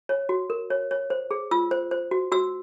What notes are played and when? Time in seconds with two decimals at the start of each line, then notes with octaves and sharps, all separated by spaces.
0.09 C#5
0.29 F#4
0.50 A#4
0.70 C#5
0.91 C#5
1.10 C5
1.31 G#4
1.51 F4 E6
1.71 C5
1.91 C5
2.11 F#4
2.32 F#4 E6